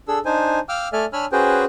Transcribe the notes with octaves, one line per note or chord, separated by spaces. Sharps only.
D4 G#4 A4 E6
D4 D#4 C5 G#5
F5 G5 D6 E6 F6
A3 A4 D5 E5 G#5 F6
D4 C#5 G#5 B5 E6 F6
C#4 F#4 G#4 B4 C5 G5